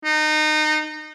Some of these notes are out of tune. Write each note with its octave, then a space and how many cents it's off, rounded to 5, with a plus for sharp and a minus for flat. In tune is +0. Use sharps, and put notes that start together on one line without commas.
D#4 -25